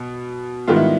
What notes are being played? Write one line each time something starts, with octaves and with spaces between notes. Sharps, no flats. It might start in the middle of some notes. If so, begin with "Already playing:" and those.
Already playing: B2
G#2 D#3 G3 B3 F4
E4